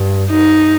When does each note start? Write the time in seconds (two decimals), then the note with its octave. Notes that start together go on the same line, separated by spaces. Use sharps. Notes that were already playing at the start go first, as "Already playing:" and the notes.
Already playing: G2
0.30 G2 D#4